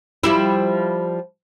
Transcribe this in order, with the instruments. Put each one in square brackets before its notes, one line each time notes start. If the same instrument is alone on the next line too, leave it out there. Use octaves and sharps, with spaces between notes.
[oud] F3 G3 E4